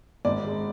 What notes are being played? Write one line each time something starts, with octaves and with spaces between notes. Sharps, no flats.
G#1 D5
G#3